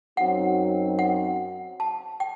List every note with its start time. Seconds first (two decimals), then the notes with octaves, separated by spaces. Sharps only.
0.17 F#2 F#3 C4 D#4 F#5
0.99 F#5
1.80 A5
2.20 G5